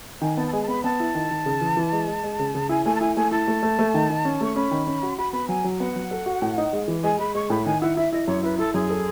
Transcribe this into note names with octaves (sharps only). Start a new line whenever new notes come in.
D#3 G#5
B3 A5
A5
G#3 G#5
A5
B3 B5
B3 A5
E4
D#3
D#3
C#3
E3
E3
G#3
G#3
G#3
C#3
C#3
E4 G#5
A3 G#5
A5
E4 G#5
A3 G#5
E4 A5
A3
A3
A3
D#3
D#3
C#4
A3 C#6
C#4 B5
D#3
C#4
F#4
F#4 B5
B3 B5
F#3 G#5
F#3
B3 F#5
F#3
A4
F#4
A2
D#4
G#3
E3
G#3 G#5
G#3 B5
G#3 C#6
A2 B5
D#3 G#5
E4 F#5
E4 E5
E4 D#5
F#2 C#5
E4 B4
E4 A4
F#2 G#4
A4